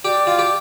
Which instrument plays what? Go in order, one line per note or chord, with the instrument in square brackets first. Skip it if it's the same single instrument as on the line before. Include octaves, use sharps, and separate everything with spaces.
[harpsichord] G4 [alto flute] D5
[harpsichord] F4
G4